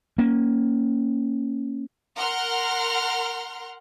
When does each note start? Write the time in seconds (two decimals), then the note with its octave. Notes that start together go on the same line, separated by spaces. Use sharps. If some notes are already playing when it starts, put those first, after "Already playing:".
0.18 A#3 C#4
2.19 A#4 F#5 C6 F6